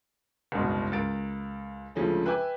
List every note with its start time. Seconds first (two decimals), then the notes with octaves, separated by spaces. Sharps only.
0.52 F#1 C2 G#2 B2
0.92 C#2 A#4 A6 D7
1.95 D2 C#3 F3 G#3 A3 C#4
2.26 B4 E5 G5 G#5 D6